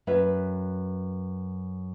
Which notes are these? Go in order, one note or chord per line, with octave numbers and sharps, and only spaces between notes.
F#2 B4 E5